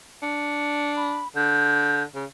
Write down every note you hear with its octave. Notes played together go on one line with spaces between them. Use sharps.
D4 C#7
B5
D3 G6
C#3